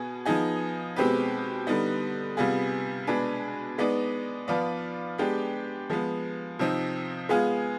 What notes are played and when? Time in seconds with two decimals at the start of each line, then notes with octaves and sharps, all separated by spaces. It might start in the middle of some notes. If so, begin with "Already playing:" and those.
Already playing: B2 B3 G#4
0.25 F3 B3 D#4 G#4
0.96 B2 G#3 C4 G4 B4
1.67 D3 G3 B3 D#4
2.37 C3 G3 B3 F4 G#4
3.07 B2 G#3 D4 G#4 B4
3.78 G#3 B3 D#4 B4 D5
4.48 F3 B3 F4 B4 D5
5.18 G#3 B3 D4 G4
5.89 F3 G#3 B3
6.59 C3 F3 C4 D#4
7.29 G#3 B3 F4 G#4